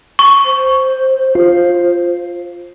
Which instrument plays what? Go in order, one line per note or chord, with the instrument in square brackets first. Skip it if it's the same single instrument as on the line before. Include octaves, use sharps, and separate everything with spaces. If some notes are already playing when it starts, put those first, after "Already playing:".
[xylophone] C#6
[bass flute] C5
[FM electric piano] F4